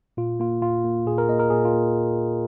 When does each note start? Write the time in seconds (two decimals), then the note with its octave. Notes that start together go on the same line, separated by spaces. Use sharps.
0.17 A#2 F4
0.40 A#3 F4
0.62 A#2 F4
0.84 A#3
1.06 A#2 G#4
1.18 A#4
1.29 A#3 D#5
1.39 A#4
1.50 A#2 G#4
1.65 F4
1.73 A#3